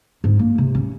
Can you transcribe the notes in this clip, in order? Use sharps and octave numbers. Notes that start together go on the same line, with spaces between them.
G#2
A#3
C3
C#4